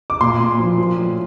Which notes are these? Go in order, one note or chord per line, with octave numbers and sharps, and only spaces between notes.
D6
A#2 C6
A#2
F3
F3
A2